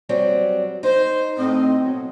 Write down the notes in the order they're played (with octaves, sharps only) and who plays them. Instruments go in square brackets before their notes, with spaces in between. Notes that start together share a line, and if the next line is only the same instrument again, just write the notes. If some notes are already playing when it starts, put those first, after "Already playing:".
[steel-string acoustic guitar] F#3 G3 C4
[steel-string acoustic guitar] D#4 [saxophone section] C5
[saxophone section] A2 D#5 [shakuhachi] C4
[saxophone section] B2 F#3